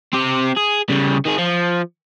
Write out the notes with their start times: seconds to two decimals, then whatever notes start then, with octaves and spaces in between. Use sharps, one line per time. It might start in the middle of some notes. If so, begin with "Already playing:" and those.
0.13 C4 G4
0.57 G#4
0.89 C#3 G3
1.25 D#3 G#4
1.38 F3